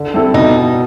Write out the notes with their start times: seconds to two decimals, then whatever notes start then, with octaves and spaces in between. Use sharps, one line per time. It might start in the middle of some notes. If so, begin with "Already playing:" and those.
Already playing: D3
0.14 G3 C4 E4 A4
0.34 B2 D#4